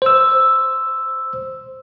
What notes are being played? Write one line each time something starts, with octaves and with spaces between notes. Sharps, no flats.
C5 E6